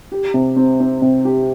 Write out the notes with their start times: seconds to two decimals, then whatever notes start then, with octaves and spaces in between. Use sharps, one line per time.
0.12 G4
0.34 C3
0.56 C4
0.80 C4
1.02 C3
1.25 G4